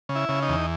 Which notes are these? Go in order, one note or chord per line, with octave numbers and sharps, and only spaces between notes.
C#3
E4
C#3
D#4
E2